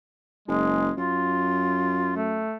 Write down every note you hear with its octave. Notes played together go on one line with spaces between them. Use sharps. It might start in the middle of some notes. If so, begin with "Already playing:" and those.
F#1 G#3
F#2 F4
A3